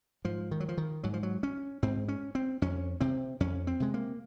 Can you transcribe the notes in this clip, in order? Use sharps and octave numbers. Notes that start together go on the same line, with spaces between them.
G#2 F3
D#3
F#3
F3
D#3
G#2 F#3
F3
F#3
C#4
G#2 C4
C#4
C4
F2 C#4
C3 C4
F2 C#4
C4
C3 G#3
A#3